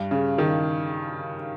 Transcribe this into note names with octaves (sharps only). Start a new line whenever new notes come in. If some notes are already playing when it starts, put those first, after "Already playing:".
Already playing: G2
C#3
D#3